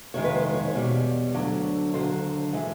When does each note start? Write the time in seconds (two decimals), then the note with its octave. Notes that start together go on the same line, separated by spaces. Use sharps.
0.14 F2 C3 D#3 G#3 C#5
0.24 B4
0.34 C5
0.54 C#5
0.74 E2 B2 G3
1.34 D2 D3 F#3
1.94 D#2 D3 F#3 C5
2.53 E3 G#3